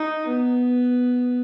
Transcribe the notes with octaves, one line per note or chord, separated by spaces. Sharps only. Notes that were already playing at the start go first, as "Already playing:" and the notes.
Already playing: D#4
B3